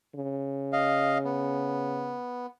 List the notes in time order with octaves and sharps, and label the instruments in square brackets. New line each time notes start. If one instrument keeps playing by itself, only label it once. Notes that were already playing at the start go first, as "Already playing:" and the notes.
[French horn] C#3
[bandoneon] D#5 F5
B3